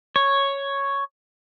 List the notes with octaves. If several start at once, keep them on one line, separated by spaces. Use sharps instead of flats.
C#5